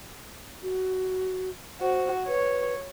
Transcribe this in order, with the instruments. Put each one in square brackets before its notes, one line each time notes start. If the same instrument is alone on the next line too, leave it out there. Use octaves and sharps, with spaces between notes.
[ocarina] F#4
[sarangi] F#4 [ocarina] C5
[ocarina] B4 [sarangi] C#5